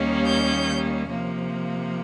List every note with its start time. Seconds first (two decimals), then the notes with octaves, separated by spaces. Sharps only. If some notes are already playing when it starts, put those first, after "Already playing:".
Already playing: D#2 D#3 G3 A#3 C#4
0.26 G6
1.10 C3 F3 A#3